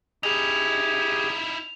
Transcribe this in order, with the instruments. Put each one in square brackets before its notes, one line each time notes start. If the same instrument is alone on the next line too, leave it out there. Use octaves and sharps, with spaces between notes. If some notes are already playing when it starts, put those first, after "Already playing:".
[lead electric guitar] D#4 E4 [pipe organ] G4 G#4 G#5 [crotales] F7